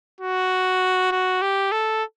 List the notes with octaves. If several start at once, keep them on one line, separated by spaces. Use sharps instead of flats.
F#4
F#4
G4
A4